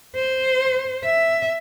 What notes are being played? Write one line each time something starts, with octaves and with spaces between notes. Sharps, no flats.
C5
E5